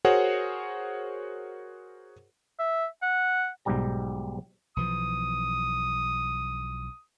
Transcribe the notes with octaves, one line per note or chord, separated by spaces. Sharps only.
F#4 G#4 A#4 C5 C#5 F#5
E5
F#5
B1 G#2 G3 G4 A#5
B1 E3 F3 D#6